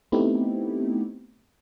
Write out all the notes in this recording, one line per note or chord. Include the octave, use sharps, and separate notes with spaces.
A3 B3 C4 D#4 E4 G4